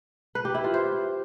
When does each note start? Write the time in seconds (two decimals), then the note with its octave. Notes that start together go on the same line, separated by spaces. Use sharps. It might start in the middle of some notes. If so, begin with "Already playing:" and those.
0.35 B4
0.45 G4
0.55 E4
0.64 F4
0.74 C5